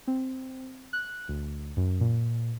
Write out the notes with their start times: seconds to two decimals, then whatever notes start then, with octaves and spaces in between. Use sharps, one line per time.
0.07 C4
0.93 F#6
1.29 D2
1.77 F#2
2.00 A#2